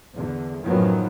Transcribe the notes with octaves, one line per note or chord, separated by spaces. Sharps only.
E2 D3
F#2 A2 D#3 F3 F#3 B3